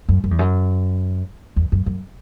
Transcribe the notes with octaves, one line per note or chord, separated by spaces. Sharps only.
F#2
F#2
E2
F#2
E2
F#2
F#2